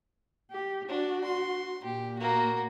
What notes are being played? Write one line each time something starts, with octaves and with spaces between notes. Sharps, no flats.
G4
D4 F#4
C6
A#2 G4
A#3 F#4